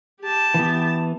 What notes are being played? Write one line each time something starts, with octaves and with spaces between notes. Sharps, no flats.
G4 A5
E3 B3